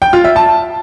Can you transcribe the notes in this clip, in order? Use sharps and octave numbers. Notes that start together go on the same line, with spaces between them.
G5
F4
E5
A5